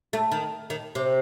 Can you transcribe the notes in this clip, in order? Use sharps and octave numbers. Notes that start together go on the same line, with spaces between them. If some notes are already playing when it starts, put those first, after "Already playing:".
A3
D#3
D#3
C3